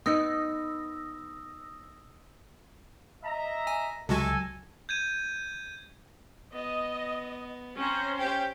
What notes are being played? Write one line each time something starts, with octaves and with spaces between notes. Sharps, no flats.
B3 D#4 D#6 E6 A#6
D#5 E5 A#5
G#5
C#2 C3 F#3 G#3 F#4 A4 G#5 A#6
G6 G#6 D#7
B3 D#5
C4 C#4 C5 A#5
G4 G5